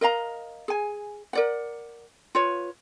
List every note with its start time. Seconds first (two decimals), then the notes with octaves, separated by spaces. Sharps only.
0.01 A#4 D#5 F5 A#5
0.68 G#4 G#5
1.33 A#4 D5 F#5
2.35 F4 B4 C#5